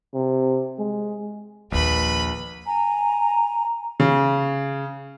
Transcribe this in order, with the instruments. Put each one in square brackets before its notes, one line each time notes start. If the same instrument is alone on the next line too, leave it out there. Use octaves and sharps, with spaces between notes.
[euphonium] C3
G#3
[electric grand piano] A#1 [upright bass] D#2 D#3 [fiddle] B4 B5
[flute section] G#5 A#5
[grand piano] C#3